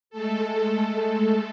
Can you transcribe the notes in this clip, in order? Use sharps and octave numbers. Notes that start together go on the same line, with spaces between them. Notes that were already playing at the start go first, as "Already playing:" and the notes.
G#3 A3 A4